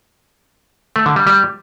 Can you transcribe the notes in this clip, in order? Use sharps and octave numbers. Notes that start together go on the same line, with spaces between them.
A3
D3
G3
G3